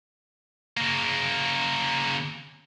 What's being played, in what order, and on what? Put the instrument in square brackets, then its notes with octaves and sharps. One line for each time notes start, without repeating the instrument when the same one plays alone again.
[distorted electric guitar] C#3 A#3